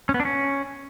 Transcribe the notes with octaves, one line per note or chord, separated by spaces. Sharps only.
C#4
B3
D4
C#4